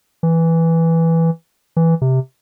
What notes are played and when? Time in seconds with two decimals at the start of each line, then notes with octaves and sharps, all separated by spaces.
0.23 E3
1.77 E3
2.02 C3